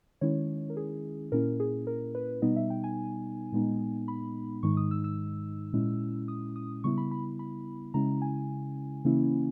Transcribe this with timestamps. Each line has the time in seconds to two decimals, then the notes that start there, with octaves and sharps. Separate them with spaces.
0.21 D#3 G#3 C#4 E4 C#5
0.70 A#4
0.77 G#4
1.32 A#2 A#3 C#4 E4 A#4
1.60 G#4
1.87 A#4
2.15 B4
2.42 B2 G3 B3 D#4 D#5
2.56 E5
2.70 G5
2.84 G#5
3.52 A#2 G#3 B3 D#4
4.08 B5
4.63 G#2 D#3 G#3 D#4 C#6
4.77 D#6
4.91 E6
5.04 E6
5.73 A#2 G#3 C#4 E4
6.28 D#6
6.56 D#6
6.84 C#3 G3 B3 E4 C#6
6.98 B5
7.11 B5
7.39 B5
7.94 C#3 G#3 C#4 E4 A#5
8.22 G#5
9.05 C#3 E3 A#3 C#4 E4